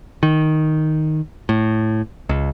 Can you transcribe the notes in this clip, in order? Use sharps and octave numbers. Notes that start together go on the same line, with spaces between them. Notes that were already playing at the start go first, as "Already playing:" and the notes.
D#3
A2
C#2